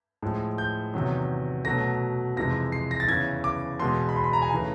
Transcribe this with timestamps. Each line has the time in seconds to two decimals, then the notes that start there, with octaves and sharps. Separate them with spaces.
0.22 A2 F3 G#3
0.58 G6
0.94 E2 C3 D#3 F#3
1.65 B2 F#3 A3 A#6
2.37 F2 C3 E3 G#3 A#6
2.72 C7
2.91 A#6
3.00 A6
3.08 E2 C#3 E3 G#6
3.44 D6
3.79 E2 B2 G#3 C6
4.09 B5
4.16 C6
4.24 B5
4.33 A#5
4.42 G#5
4.51 C#3 E3 A3 A#5